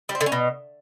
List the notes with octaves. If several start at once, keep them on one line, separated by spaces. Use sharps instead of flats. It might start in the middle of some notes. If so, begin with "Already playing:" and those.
G3
C4
D3
C#4
B2